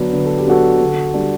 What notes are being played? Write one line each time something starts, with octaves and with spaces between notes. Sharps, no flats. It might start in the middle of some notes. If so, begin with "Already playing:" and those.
Already playing: D3 F#3 B3 D4
D3 B4
A4
G4
F#3 B3 D4 F#4 A4
D3
G3 D4